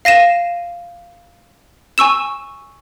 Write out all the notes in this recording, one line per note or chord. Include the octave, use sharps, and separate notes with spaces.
F5 A#6 D#7 E7
G#5 C#6 E6 E7